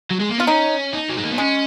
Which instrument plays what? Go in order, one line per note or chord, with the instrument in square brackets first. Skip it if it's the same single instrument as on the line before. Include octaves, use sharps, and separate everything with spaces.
[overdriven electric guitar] F#3
G#3
A#3
[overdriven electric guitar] B3 [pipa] F4
[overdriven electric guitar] C#4 [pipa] D#4
[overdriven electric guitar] D#4
F#3
G#3
A#3
B3
[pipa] G#3 [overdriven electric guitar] C#4